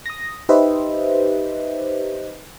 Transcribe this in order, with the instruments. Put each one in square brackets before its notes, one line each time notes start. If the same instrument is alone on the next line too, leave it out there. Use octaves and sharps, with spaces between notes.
[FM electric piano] D#6 A#6
D#4 G4 B4 C5 D#5 E5